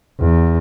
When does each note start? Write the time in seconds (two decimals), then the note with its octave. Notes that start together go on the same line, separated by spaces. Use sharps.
0.20 E2